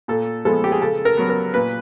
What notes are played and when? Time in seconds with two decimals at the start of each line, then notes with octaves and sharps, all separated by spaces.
0.08 A#2 A4
0.45 F3 G#3 B3 A4
0.64 G4
0.72 G#4
0.82 C#3 A4
1.05 A#4
1.17 F#3 B3
1.29 A#4
1.54 A#2 B4